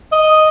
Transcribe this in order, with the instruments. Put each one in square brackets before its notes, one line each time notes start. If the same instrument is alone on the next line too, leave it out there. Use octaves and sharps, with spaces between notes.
[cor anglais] D#5